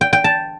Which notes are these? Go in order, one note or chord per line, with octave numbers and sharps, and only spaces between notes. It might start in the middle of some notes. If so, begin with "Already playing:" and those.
G5
G5
A5